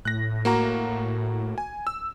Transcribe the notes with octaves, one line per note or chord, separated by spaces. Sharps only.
A2 F#6 A#6
A#3 F#4 A#5
G#5
E6